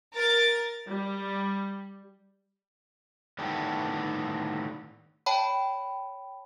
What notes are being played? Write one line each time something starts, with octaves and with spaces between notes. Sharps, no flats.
A#4 A6
G3
A2 D3 D#3 B3 D4 G4
C#5 G5 A5 B5